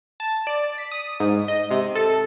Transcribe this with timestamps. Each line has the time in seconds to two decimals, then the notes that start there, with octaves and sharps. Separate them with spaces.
0.20 A5
0.47 D5
0.78 B6
0.92 D#6
1.20 G#2
1.48 D#5
1.71 C3
1.95 A4